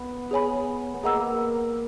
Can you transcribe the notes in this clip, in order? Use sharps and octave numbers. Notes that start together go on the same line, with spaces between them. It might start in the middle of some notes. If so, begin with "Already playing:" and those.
Already playing: B3
G#4 C#5 G#5 B5
B3
A#3 G#4 D#5 F#5 A#5 E6